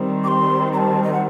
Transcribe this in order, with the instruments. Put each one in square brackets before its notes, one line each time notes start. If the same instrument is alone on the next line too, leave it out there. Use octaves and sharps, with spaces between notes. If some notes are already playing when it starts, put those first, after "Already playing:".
Already playing: [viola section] D#3 G3 C4
[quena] D6
C6
A#5
A5
D#5
F#5